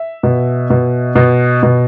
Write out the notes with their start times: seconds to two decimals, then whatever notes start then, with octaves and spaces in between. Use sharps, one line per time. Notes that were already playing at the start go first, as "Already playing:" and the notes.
Already playing: E5
0.23 B2
0.70 B2
1.16 B2
1.63 B2